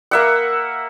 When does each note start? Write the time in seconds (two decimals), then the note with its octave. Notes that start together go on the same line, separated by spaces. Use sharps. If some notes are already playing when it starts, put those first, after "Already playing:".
0.11 A#3 E5 F#5